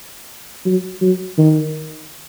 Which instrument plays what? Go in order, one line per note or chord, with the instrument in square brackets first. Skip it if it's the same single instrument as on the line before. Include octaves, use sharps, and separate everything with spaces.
[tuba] F#3
F#3
D#3